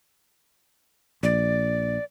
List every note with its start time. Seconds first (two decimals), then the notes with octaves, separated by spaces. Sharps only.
1.23 A#1 D5